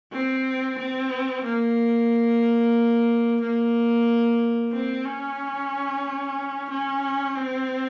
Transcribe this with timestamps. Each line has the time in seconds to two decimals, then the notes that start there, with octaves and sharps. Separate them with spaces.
0.13 C4
0.78 C4
1.44 A#3
3.41 A#3
4.73 C4
5.06 C#4
6.70 C#4
7.36 C4